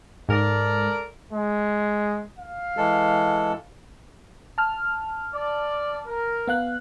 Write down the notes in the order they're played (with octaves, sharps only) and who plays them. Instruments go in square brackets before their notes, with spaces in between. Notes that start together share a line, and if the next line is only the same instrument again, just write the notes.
[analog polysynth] G#2 [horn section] A4 A#4 D5
[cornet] G#3
F5
[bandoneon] E3 G#3 A4
[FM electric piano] A5 F6
[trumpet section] D5
A#4
[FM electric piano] B3 F5 F#6